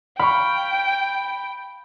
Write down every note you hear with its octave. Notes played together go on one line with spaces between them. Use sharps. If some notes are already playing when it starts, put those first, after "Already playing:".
F5 G5 B5 C#6